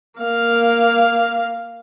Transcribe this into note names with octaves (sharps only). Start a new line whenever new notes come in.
A#3 F5